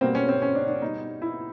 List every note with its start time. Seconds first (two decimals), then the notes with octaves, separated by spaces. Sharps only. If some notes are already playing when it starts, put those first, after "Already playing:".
0.01 B2 G3 A#3 C4
0.15 C#4
0.28 C4
0.42 C#4
0.55 D4
0.68 D4
0.82 B2 G3 B3 D#4
1.22 E4